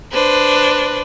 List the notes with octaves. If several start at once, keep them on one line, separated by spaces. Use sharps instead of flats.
D4 B4 C5